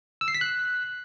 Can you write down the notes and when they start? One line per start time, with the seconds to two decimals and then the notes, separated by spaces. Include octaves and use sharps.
0.21 E6
0.28 C7
0.35 B6
0.41 F#6